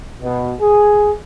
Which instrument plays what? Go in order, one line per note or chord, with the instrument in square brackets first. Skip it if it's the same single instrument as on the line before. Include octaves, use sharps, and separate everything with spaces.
[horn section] B2
G#4